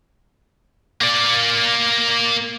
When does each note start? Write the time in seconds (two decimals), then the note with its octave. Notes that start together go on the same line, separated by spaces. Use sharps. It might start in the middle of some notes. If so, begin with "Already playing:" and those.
1.01 A#3 D5